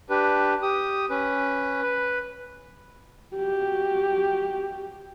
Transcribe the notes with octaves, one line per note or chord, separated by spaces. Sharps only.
D4 G4 B4
G4 D#6
C#4 B4
B4
F#4 G4